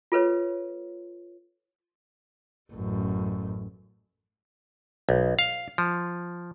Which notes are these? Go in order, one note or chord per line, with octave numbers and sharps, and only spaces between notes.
F4 A4 B4 C#5
A1 F#2
B1
F5
F3